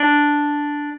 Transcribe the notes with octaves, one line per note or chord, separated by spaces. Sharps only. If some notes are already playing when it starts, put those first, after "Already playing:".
Already playing: D4